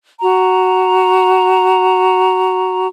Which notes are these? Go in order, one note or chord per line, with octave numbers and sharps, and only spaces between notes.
F#4 A#5